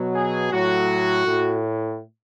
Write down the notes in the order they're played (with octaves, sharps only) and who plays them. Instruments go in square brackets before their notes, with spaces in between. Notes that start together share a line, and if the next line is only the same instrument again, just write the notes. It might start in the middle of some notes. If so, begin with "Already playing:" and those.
Already playing: [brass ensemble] B2 F#3
G#4
A2 F#3 F#4
A2